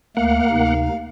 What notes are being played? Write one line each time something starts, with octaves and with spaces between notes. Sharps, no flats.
D2 A3 A#3 F5 F#5
D2 C3 D#4